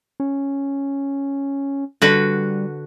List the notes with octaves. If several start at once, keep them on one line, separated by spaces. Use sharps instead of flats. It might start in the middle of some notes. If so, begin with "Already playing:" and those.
C#4
D3 G3 F#4 B4